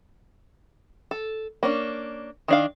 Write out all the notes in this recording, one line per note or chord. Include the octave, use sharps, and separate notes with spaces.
A4
A#3 C#4 D4
D#3 D4 F5